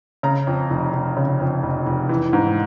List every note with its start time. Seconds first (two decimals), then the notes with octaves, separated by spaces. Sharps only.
0.23 C#3 A#5
0.47 F2
0.70 F1
0.93 F1
1.17 C#3
1.40 F2
1.63 F1
1.87 F1
2.09 E3
2.33 G#2